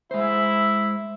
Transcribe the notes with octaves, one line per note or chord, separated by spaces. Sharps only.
G#3 E4 C5